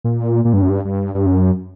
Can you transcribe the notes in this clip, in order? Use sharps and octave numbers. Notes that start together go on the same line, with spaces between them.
A#2
A#2
G2
F#2
G2
G2
G2
F#2